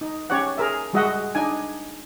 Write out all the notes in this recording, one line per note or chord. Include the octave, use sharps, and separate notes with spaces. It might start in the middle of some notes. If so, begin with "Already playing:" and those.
D#4
C#4 G4 C#5 D5 F#5
G#4 A#4 E5
G3 G#3 F#4 D#5 E5 F#5
D4 D#4 G#5